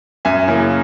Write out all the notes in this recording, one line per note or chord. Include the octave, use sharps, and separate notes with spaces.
F#2 E5 G#5
C#3 E3 A#3